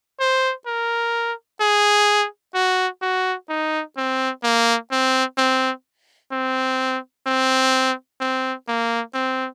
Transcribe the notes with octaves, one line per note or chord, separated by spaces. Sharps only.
C5
A#4
G#4
F#4
F#4
D#4
C4
A#3
C4
C4
C4
C4
C4
A#3
C4